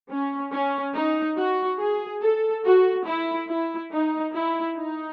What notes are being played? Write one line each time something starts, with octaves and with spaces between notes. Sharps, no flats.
C#4
C#4
D#4
F#4
G#4
A4
F#4
E4
E4
D#4
E4
D#4